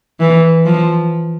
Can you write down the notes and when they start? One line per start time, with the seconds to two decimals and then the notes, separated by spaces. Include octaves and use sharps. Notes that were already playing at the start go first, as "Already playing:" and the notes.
0.20 E3
0.65 F3